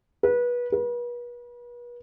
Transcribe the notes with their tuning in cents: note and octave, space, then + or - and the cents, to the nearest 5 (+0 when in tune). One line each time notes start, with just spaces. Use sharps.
B4 -25
B4 -40